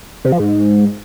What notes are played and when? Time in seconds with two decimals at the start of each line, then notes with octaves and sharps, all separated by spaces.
0.25 C3
0.32 F3
0.40 G#2